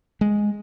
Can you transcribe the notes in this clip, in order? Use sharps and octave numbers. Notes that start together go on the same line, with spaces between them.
G#3